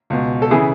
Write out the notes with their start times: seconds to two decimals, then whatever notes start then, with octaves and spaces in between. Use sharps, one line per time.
0.10 C#2 B2
0.42 A4
0.51 C#3 E3 E4 G#4